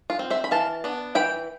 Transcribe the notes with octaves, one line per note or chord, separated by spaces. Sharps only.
F4
C4
C5 E5
B5
E3 F5 A5
B3 D4
E3 G5 B5